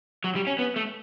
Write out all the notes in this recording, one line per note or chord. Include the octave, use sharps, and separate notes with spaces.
F#3
G3
C#4
B3
A3